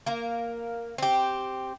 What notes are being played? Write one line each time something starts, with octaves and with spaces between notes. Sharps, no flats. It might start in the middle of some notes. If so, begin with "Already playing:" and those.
A#3 A#4
C4 G4